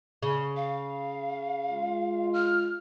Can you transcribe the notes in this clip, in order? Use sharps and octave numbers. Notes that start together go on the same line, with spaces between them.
C#3
F5
G#3 F4
F6